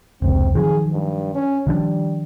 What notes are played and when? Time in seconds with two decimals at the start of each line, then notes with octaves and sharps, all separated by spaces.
0.22 F1 C#2 C4
0.55 D#3 F3 F#3 G#4
0.93 G2
1.34 C#4
1.67 D#3 F3 G3 D4